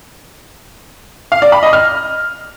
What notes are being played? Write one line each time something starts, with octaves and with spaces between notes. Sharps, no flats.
F5
D5
B5
D#5
F6